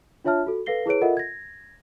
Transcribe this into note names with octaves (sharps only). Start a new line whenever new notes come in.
D4 F4 C#5 E5 A5 F6
F#4 A4
A4 B4 F5 A#6 C7 G7
E4 G#4 B4 C#5 D7
F4 A4 A#4 D#5 E5 F#5
G#6 A#6